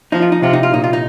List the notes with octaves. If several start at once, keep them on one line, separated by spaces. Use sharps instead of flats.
F3 D#4
F4
D#4
C3 F4
D#4
F4
A#2 D#4
F4
D#4